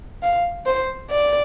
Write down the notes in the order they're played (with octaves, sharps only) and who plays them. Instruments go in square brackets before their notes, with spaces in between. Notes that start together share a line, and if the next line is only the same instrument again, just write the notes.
[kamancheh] F5
C5
D5